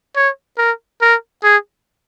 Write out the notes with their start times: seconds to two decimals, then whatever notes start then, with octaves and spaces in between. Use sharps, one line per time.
0.16 C#5
0.58 A#4
1.02 A#4
1.44 G#4